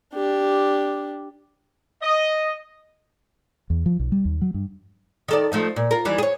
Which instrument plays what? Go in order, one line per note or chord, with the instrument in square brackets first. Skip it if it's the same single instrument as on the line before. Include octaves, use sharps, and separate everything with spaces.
[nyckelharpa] D4 G4
[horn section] D#5
[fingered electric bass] E2
F3
B1
G3
D#2
F#3
G2
[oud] D#3 A4 D5
F3 A3 D#4
A#2
F4 A#4
D#2 E3 G3
G#4 C#5